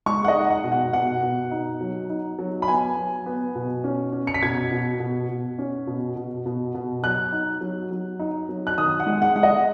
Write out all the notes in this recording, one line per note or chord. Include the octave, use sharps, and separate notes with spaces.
G#3 C#6
F#5
D#5
D#4
F#5
B2
F#5
B2 F#5
B2
D#4
F#3
D#4
F#3
B5
B3 G#5
F#3
B3
B2
C#4
C#4
C#7
B6
B2 G#6
B2
B2
B2
C#4
B2
B2
B2
B2
F#3 F#6
D#4
F#3
F#3
D#4
F#3
F#6
D#3 D#6
F#5
G#3
F#5
G#3 F#5
D#5